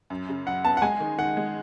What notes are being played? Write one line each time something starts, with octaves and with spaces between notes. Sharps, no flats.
F#2
C#3
F#2 F#5
B3 A5
F#5
G#3 G#5
D#3
D#3 F#5
G#3